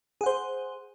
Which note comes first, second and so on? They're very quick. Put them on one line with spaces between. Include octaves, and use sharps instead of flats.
G#4 F#5 C5